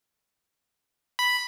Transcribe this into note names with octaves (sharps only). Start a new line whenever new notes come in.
B5